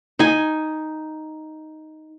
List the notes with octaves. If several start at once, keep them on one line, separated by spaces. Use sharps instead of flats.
D#4 G#5